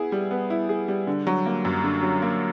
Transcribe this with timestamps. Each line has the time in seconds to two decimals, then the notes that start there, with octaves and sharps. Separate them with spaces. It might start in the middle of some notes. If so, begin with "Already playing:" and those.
Already playing: B3 E4 G#4
0.12 G3
0.31 B3
0.50 E4
0.69 G#4
0.88 G3
1.07 D3
1.27 F#3
1.46 A#3
1.65 F#2
1.84 D3
2.03 F#3
2.22 A#3